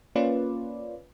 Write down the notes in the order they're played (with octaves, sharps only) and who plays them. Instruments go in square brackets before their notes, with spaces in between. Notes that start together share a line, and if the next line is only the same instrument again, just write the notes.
[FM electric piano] A#3 C#4 F4 B4 D5